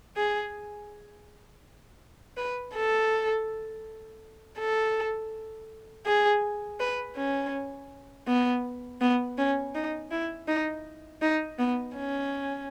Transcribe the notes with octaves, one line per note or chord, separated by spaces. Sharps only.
G#4
B4
A4
A4
G#4
B4
C#4
B3
B3
C#4
D#4
E4
D#4
D#4
B3
C#4